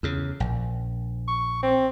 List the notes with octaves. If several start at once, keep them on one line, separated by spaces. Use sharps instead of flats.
E2 C#3
A#1
C#6
C4